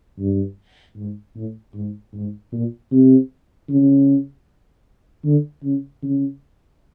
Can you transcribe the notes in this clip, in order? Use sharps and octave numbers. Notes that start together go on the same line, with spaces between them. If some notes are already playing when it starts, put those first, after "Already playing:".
G2
G#2
A2
G#2
G#2
A#2
C3
C#3
D3
C#3
C#3